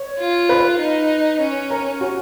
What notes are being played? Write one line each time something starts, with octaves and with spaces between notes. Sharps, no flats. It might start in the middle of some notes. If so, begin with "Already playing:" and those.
Already playing: C#5
F4
B4
D#4
C#4
A#4
F#4